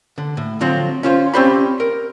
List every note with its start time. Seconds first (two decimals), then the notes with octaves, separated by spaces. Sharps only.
0.18 D3
0.37 A2
0.61 D3 F3 F#3 C4
1.03 C#4 F4 C5
1.34 C4 C#4 G4 C5 D5 B5
1.80 A#4